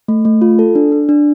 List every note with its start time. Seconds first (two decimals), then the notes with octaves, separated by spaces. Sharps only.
0.08 A3
0.25 A3
0.41 F4
0.59 A4
0.75 D4
0.92 D4
1.09 D4